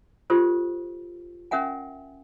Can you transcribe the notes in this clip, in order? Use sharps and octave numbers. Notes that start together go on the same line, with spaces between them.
F4 G4 A4 C5
C#4 A#4 E5 F#5 G#5